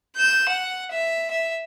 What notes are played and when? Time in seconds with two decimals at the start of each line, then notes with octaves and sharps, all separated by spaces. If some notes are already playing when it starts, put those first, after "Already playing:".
0.16 G6 E7
0.49 F#5
0.92 E5
1.31 E5